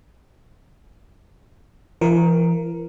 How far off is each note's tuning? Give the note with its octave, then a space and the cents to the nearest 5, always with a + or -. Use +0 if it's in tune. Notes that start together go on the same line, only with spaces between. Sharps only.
E3 +45 A#4 +0